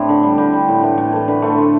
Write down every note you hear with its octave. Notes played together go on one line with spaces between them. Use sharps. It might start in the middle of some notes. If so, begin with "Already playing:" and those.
Already playing: A2 A3 C4 D4 E4 G4
D3
G3
D3 G4
G3
A2
E3 A3
A2 A4
E3 A3 A4
D3 B4
A3 C5
D3 C5